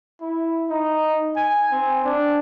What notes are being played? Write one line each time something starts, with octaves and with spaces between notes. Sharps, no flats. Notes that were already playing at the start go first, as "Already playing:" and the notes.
E4
D#4
G#5
C4
D4